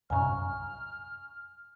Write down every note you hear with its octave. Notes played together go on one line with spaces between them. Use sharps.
C2 F#2 G#5 A#5 C#6 F6